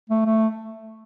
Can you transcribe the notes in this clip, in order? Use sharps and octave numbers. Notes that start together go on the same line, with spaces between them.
A3
A3